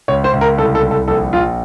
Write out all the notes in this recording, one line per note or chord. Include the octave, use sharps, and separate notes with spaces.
C#2 C#5
C5
C#2
A#4
C2 A4
A4
C2
A4
A#1 A4
A#1 F4